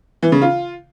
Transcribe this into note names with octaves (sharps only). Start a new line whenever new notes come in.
E3
C#3
F4